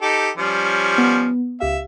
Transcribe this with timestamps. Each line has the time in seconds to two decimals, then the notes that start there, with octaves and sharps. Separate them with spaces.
0.02 D#4 G4 A4
0.37 F3 G3 C#4
0.98 B3
1.60 C#2 G4 E5 F5